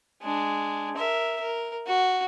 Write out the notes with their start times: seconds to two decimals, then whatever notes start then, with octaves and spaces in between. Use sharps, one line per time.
0.22 G#3 D4
0.96 A#4 E5
1.41 A#4
1.87 F#4